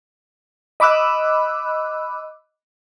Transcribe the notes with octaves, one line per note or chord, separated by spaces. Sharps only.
D#5 B5 D6 E6 F#6